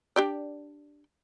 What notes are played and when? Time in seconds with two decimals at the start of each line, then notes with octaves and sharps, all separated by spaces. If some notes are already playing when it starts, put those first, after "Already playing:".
0.16 D4 G4 D5